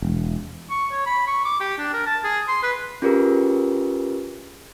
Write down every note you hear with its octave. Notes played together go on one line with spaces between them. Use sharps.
E1
C#6
C#5
B5
C#6
D6
G4
D4
A#4
A5
G#4
C6
B4
C#4 F4 G4 G#4 A#4 B4